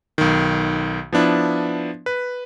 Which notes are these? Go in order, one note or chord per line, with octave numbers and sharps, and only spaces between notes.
B1 D#3
F3 B3 D4 E4
B4